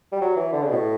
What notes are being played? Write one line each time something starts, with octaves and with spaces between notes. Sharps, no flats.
G3
F#3
E3
D3
C#3
B2
A2